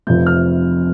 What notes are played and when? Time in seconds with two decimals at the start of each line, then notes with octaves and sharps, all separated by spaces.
0.07 F1 F2 C3 F3 G6
0.26 F6